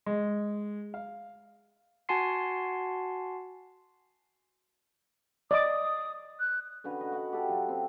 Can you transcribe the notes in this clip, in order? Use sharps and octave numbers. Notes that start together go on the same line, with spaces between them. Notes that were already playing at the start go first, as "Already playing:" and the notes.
G#3
F5
F#4 F#5 G#5 A5 C6 C7
D5 D#5 D6 D#6
F#6
D3 C#4 F#4 B4
D#5
F#4 F#5
G4 A4 F#5
F#3 F4 F#4
C4